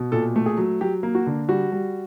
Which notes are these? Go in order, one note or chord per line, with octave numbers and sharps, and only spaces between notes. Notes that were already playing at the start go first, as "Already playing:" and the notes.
Already playing: B2
A#2 A4
A3
G#4
F#3
F#3 G4
A#3
F#4
D3
G3 F#4
G3